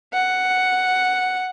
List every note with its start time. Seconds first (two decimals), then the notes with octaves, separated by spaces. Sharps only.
0.13 F#5